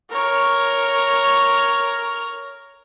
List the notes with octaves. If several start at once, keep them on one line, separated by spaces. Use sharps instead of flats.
A#4 C#5